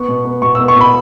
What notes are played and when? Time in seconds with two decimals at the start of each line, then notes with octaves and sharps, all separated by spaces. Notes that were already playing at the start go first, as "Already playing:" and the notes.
Already playing: B3 C#6
0.08 B2
0.25 B3
0.42 B2 C#6
0.55 E6
0.59 B3
0.68 C#6
0.76 B2 B5